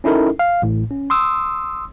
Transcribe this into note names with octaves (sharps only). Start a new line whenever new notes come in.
C#4 D#4 E4 A4 A#4
F5
A1 A2
C#4
C6 D#6 E6